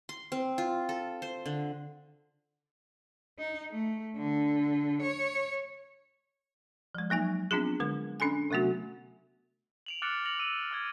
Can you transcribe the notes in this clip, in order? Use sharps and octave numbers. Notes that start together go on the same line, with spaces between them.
C6
C4
F4
A4
C5
D3
D#4
A3
D3
C#5
F3 G#3
F#3 A#3 D#4 G#5
B3 C4 D4 F4 G#4
D3 G#3 A#4
C#4 D4 A4 G#5
C3 F#3 A3 B3 F#4
D7 F7 F#7
D6 F6 F#6 A6 C#7 D7
A#6 C#7 F7 F#7
E6 D#7 F7
D6 F6 G#6